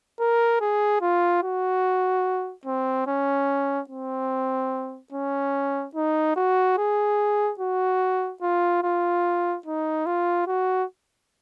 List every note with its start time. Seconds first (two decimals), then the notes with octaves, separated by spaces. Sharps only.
0.20 A#4
0.61 G#4
1.01 F4
1.43 F#4
2.66 C4
3.07 C#4
3.89 C4
5.12 C#4
5.95 D#4
6.36 F#4
6.78 G#4
7.59 F#4
8.42 F4
8.83 F4
9.66 D#4
10.06 F4
10.47 F#4